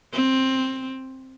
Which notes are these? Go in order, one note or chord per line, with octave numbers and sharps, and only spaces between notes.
C4